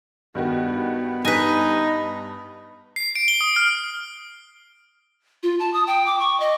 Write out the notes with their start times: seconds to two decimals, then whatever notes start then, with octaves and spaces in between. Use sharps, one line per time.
0.35 G2 D#3 B3 F#4
1.25 G2 D#4 B4 G#5 A#6
2.96 C7
3.15 D7
3.28 G7
3.41 D#6
3.56 F6
5.43 F4
5.60 A5
5.74 D#6
5.87 G5
6.06 D6
6.19 C#6
6.40 D#5